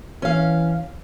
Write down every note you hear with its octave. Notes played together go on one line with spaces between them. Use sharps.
E3 C#4 F5